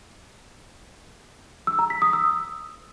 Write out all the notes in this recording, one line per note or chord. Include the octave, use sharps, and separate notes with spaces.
E6
A#5
B6
D#6
E6